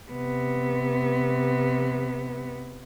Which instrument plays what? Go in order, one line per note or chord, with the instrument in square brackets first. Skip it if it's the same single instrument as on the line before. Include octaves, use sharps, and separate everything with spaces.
[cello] C3 B3